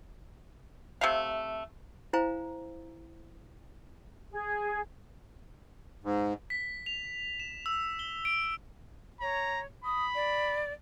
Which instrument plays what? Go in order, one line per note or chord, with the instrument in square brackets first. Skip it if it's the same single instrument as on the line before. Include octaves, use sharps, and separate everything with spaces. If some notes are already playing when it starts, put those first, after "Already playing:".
[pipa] C3 A3 F5
[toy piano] E4 C5 F5 G#5 A#5
[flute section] G#4
[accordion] G#2
[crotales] B6
F7
E7
E6
G7
D7
[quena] C#5 [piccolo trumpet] A#5
[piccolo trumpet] B5 [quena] D#6
[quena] D5